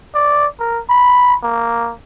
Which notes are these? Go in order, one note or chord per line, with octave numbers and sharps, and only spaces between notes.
D5
A#4
B5
A#3